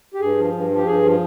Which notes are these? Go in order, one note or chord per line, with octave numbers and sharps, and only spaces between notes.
G4
G2 G#4
F3
G2
F3
G4
G2 G#4
F3